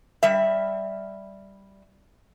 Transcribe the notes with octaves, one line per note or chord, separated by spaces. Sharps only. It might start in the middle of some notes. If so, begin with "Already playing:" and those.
G3 E5